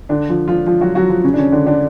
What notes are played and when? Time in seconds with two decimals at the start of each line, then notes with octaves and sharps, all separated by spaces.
0.09 D3 D4
0.29 F3 F4
0.48 F3 F4
0.66 F3 F4
0.81 F#3 F#4
0.95 F#3 F#4
1.09 F3 F4
1.24 C#3 C#4
1.34 D4
1.38 C#3 C#4
1.52 D3 D4
1.66 D3 D4